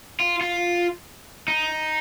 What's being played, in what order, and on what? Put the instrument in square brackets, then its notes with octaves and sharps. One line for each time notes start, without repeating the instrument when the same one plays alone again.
[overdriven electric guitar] F4
F4
D#4